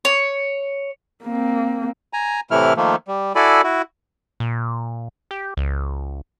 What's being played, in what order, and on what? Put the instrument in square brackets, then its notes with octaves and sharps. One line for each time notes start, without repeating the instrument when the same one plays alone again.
[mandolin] C#5
[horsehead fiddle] A#3 C4
[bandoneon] G#5 A#5
A2 C3 E3 A3 E4 F6
D#3 F3 A3 A#3
G3
E4 F#4 A4 D5 G#5 B5
E4 F#4
[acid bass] A#2
G4
C#2